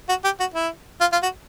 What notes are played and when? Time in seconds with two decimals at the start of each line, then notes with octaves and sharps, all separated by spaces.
0.09 F#4
0.24 G4
0.40 F#4
0.54 E4
1.01 F4
1.12 F4
1.23 F#4